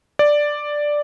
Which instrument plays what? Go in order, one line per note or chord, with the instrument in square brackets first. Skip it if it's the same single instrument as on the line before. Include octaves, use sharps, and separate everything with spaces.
[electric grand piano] D5